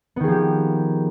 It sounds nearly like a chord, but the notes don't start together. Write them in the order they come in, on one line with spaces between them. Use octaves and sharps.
B3 D#3 G#4 F3 G4